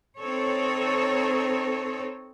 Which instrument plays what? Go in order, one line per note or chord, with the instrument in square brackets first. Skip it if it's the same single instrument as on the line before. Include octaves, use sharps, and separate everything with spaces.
[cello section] C4 D#4 A4 C#5